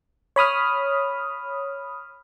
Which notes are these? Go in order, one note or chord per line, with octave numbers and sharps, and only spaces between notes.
C#5 B5 D#6 F6